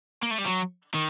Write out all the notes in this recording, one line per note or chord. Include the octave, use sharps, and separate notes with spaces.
A#3
A3
G3
F#3
D#3